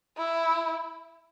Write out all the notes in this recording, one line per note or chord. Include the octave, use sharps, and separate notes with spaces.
E4